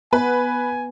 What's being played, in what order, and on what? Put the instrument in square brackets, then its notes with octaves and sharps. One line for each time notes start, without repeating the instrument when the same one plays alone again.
[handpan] B3 [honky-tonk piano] B4 [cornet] G#5